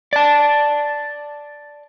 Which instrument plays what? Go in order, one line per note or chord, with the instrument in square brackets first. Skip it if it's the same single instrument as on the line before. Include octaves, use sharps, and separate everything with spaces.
[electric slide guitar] D5 A5